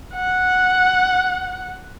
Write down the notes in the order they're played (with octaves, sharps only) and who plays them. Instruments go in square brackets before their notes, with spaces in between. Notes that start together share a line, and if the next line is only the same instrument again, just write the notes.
[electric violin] F#5